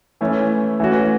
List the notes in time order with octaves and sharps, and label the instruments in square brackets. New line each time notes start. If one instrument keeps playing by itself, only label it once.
[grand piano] E3 A3 C#4 E4
E3 A3 C#4 F#4